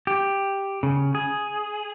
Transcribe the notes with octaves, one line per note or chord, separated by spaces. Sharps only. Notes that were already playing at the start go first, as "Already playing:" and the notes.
G4
C#3
G#4